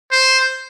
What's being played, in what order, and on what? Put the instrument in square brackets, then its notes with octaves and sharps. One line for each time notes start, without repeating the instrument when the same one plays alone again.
[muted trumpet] C5